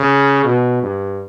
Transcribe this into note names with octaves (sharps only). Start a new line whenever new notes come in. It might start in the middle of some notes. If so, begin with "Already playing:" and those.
Already playing: C#3
B2
G2